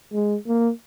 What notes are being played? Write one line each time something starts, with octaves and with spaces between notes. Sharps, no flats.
G#3
A#3